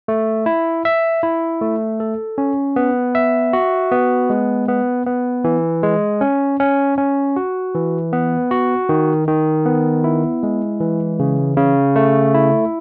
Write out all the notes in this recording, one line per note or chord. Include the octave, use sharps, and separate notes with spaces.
A3
E4
E5
E4
A3
A4
C#4
B3
E5
F#4
B3
G#3
B3
B3
E3
G#3
C#4
C#4
C#4
F#4
E3
B3
F#4
D#3
D#3
B3
E4
G#3
E3
C#3
C#3
A3
E4